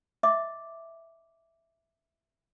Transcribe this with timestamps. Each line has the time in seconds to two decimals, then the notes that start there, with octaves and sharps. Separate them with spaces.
0.23 D#5 E5 D6